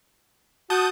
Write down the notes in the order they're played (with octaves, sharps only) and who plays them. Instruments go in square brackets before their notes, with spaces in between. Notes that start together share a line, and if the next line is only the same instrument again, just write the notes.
[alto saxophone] F#4 [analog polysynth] A5 D#6 G6